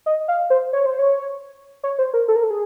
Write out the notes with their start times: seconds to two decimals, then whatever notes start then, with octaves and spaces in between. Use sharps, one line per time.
0.06 D#5
0.28 F5
0.50 C5
0.73 C#5
0.86 C5
0.99 C#5
1.84 C#5
1.99 C5
2.14 A#4
2.28 A4
2.36 A#4
2.44 A4
2.50 G#4